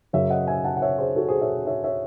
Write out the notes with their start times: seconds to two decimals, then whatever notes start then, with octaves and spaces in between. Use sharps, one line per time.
0.13 F#2 C#3 F#3 C#5 E5
0.30 D#5 F#5
0.47 E5 G#5
0.64 F#5 A5
0.77 F#5
0.82 C#5 E5
0.99 G#4 C5
1.16 F#4 A4
1.28 G#4 C5
1.41 C#5 E5
1.67 C#5 E5
1.84 C#5 E5